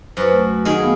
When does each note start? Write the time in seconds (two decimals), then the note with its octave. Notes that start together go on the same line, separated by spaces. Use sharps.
0.17 F#2 F#4 B4 C5
0.33 A3
0.65 D#3 G#4 D#5 F#5
0.82 A3 B3 F5